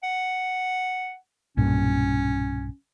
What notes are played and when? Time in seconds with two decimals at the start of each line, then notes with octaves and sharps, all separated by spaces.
0.03 F#5
1.57 B1 G2 A#2 C#4